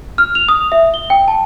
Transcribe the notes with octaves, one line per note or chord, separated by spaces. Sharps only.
F6
F7
D#6
E5
G7
G5
A5